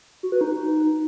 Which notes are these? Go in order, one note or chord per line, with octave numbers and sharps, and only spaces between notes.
F#4
B4
D#4